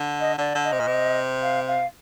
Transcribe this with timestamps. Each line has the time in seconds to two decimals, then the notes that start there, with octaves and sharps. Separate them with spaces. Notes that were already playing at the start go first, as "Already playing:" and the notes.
Already playing: D3
0.20 D#5
0.38 D3 D5
0.55 D3
0.64 D#5
0.72 C3
0.80 A#2
0.87 C3
1.42 F5
1.68 F5